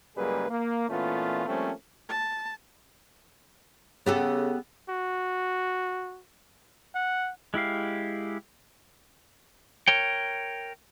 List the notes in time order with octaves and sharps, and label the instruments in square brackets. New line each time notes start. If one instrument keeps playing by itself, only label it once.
[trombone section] C#2 F#2 G3 A#3 G#4 B4
A#3
A#2 E3 A3 B3 C#4 F4
F3 G3 A3 A#3 C4 C#4
[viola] A5
[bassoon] C#3 [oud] B3 G4 A4
[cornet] F#4
F#5
[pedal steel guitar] G#3 E4 G4 F5
[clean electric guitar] A#4 C#5 G5